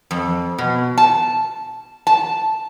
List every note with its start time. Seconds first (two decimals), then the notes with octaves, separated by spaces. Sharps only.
0.11 F2
0.58 B2
0.98 A5
2.07 A5